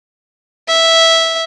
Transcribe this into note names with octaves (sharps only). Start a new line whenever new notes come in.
E5